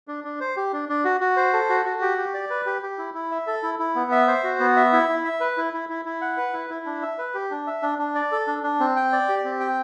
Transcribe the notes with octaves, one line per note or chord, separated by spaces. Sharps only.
D4
D4
C5
G4
D4
D4
F#4
F#4
C5
A4
F#4
F#4
G4
G4
D5
B4
G4
G4
E4
E4
E5
A4
E4
E4
B3
E5
C5
F#4
B3
E5
E4
E4
E5
B4
E4
E4
E4
E4
F#5
B4
E4
E4
D4
E5
B4
G4
D4
E5
D4
D4
D5
A4
D4
D4
C4
G5
D5
G4
C4
G5